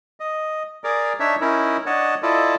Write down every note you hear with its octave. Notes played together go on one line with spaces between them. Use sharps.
D#5
G#4 A#4 D5
D4 D#4 C#5 E5
C#4 D#4 E4 A#4
D4 C#5 D#5 F#5 A5
E4 F4 A4 D5 D#5